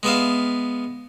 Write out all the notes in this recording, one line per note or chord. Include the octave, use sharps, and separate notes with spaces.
G#3 B3 E5 F5